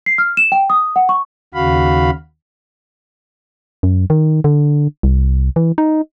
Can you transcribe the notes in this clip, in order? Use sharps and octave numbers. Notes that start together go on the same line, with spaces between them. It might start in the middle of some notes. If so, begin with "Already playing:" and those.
C7
F6
E7
G5
D#6
F#5
C#6
D#2 C#3 F#4 F5 B5
F#2
D#3
D3
C2
E3
D#4